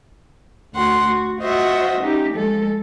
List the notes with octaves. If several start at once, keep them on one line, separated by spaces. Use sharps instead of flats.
D2 F#4 F#5 C6
F#4
F4 F#4 C5 D#5 E5 F#5
C#4 D#4 G4
F3 G#3 A4